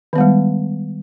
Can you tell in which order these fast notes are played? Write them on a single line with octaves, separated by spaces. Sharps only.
D#3 B3 G3 G#3